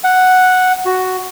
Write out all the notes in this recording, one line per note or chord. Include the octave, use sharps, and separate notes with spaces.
F#5
F#4